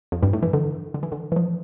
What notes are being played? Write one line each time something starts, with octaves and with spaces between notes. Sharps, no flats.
F2
G2
A2
E3
D3
D3
E3
D3
E3
F3